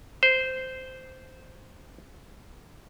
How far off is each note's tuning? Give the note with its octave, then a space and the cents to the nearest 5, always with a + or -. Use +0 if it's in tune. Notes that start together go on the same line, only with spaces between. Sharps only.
C5 -10